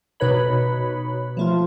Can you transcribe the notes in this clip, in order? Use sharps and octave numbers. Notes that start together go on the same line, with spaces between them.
B2 D#4 B4 C#5 B5
F3 A3 F4